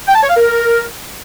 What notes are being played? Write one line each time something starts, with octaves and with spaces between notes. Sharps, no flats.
G5
A5
C#5
F5
A#4